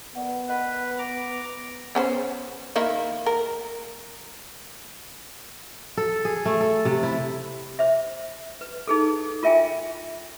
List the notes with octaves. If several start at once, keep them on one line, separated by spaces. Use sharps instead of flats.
B3 A#4 D5 F#5
A#4 B4 D#5 F#5
A#5 D6
B3 C#4 C5
D#3 A#3 E4
A#4
A4
G#4
A3
A4
C3
E4
C5 E5
B4
D#4 G#4 A4
F4 A#4 E5 G5 G#5